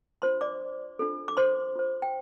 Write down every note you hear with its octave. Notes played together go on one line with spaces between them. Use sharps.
D4 F4 C5 C6
D5 D6
D4 F4 A4
D6
C5 C6
F4 C5
G5